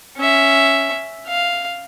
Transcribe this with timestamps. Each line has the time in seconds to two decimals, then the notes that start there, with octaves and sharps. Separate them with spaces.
0.17 C#4 E5
1.28 F5